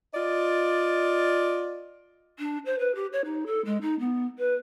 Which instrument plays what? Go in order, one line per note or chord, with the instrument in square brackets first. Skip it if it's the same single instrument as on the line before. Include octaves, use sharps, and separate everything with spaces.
[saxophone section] F4 D5 D#5
[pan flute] D4
C5
B4
G4
C#5
D#4
A4
G#3
D#4
B3
B4